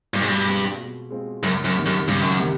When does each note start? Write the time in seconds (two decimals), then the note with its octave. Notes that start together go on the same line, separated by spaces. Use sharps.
0.13 G2 B2
0.21 G#2
0.28 G2
0.46 G#3 C4 F4
0.77 B2
1.10 G#3 C4 F4
1.43 C#2 F#2
1.65 F#2
1.75 C3 D#3
1.86 F#2
2.08 C#2 G2
2.22 F#2
2.39 C3 D#3